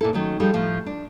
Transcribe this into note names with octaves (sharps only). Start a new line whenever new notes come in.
A#2 E4 A4
D#3 F#3 A3 C#4
F3 G3 D#4 G#4 A4
A2 F3 A3 F4
D4